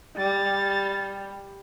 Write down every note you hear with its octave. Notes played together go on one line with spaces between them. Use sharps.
G3 A6